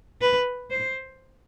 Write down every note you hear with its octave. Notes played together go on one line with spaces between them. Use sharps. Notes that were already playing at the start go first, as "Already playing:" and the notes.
B4
C5